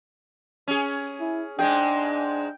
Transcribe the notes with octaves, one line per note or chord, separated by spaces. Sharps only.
C#4 G#4
E4
G#2 G#3 D4 G#4 G5